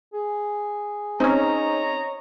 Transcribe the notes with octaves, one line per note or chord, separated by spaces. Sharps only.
G#4
C4 C#4 D#4 C#5 D#5 A#5